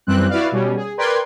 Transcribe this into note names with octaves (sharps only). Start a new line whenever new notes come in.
F#2 E3 G3 C4 F#6
E4 F#4 B4 D5 F5
B2 G3 C#4
G#4
A#4 B4 D5 G5 C6 G#6